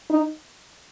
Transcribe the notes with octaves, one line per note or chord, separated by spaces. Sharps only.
D#4